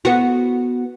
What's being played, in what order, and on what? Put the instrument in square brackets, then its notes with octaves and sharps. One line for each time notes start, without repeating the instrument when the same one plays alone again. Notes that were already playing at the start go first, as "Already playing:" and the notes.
[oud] B3 F#4